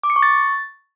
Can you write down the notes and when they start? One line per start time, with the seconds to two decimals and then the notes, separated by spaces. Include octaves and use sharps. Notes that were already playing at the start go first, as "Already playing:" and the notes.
0.03 D6
0.10 C#7
0.16 C#6
0.23 A6